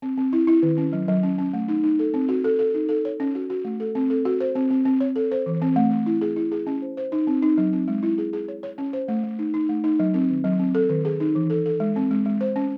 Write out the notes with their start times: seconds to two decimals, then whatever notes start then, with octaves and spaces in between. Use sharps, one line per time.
0.02 C4
0.18 C4
0.33 E4
0.47 E4
0.63 D#3
0.78 C#4
0.93 F#3
1.08 F#3
1.23 C#4
1.39 C#4
1.54 A3
1.68 D#4
1.84 D#4
1.99 A4
2.14 C4
2.29 F#4
2.44 A4
2.59 A4
2.74 D#4
2.89 A4
3.05 C#5
3.20 C#4
3.35 F#4
3.50 F#4
3.65 A3
3.80 A4
3.95 C4
4.10 A4
4.25 F#4
4.41 C5
4.55 C4
4.70 C4
4.85 C4
5.00 C#5
5.16 A4
5.32 C5
5.46 E3
5.62 C4
5.76 A3
5.91 A3
6.06 E4
6.21 G#4
6.36 E4
6.52 G#4
6.67 C#4
6.82 C5
6.97 C5
7.12 D#4
7.27 C4
7.42 D#4
7.58 F#3
7.73 C4
7.88 G#3
8.03 E4
8.18 G#4
8.33 G#4
8.48 C#5
8.63 C#5
8.78 C#4
8.93 C5
9.08 A3
9.24 A3
9.39 D#4
9.54 D#4
9.69 A3
9.84 D#4
10.00 F#3
10.14 C4
10.30 D#3
10.44 F#3
10.60 C4
10.75 A4
10.89 D#3
11.05 G#4
11.20 D#4
11.35 E3
11.50 A4
11.66 A4
11.80 G#3
11.96 C4
12.11 G#3
12.26 G#3
12.41 C5
12.56 C#4